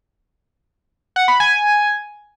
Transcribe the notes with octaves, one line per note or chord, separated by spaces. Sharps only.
F#5
B5
G#5